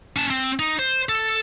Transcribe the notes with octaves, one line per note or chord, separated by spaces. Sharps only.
C#4 A5
C4
D#4
C5
A4